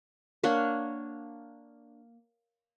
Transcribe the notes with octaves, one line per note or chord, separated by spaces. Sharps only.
A#3 D4 C#5 F#5